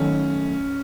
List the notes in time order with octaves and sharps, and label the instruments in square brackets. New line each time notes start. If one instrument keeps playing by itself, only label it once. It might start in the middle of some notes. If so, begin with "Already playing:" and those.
Already playing: [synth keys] D#3 F#3 A3 [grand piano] C#4